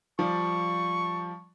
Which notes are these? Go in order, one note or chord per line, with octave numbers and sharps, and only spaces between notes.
F3 G3 D5 C#6